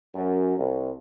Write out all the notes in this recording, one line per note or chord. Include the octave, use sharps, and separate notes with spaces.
F#2
C2